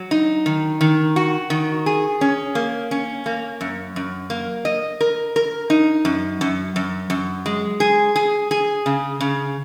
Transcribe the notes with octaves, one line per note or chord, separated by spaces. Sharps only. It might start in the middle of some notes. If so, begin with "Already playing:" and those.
Already playing: F#3
D#4
D#3
D#3
F#4
D#3
G#4
C#4
A#3
C#4
A#3
F#2
F#2
A#3
D#5
A#4
A#4
D#4
F#2
F#2
F#2
F#2
G#3
G#4
G#4
G#4
C#3
C#3